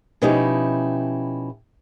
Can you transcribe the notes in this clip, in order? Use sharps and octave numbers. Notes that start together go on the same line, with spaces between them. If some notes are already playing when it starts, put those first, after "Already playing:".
B2 F3 C#4 D#4 E4 G4